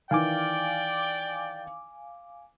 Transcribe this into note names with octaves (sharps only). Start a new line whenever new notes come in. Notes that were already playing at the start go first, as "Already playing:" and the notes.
D#3 E3 D5 F5 G5 G#5 D6